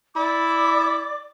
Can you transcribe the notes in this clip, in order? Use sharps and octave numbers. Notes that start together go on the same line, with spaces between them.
E4 D5 D6